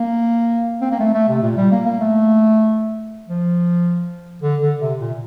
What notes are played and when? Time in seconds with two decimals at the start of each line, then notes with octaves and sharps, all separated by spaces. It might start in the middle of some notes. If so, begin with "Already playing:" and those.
Already playing: A#3
0.81 C4
0.91 A#3
1.00 A3
1.14 A3
1.29 C3
1.43 A#2
1.57 G3
1.72 A#3
1.86 A#3
2.00 A3
3.28 F3
4.42 D3
4.62 D3
4.81 C3
4.99 A#2